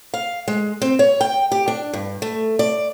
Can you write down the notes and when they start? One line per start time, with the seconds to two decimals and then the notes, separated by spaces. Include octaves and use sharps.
0.14 F5
0.48 G#3
0.82 C4
0.99 C#5
1.21 G5
1.52 G4
1.68 D4
1.94 G2
2.22 A3
2.59 D5